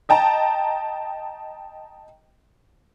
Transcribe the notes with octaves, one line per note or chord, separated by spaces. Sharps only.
D#5 G5 A5 A#5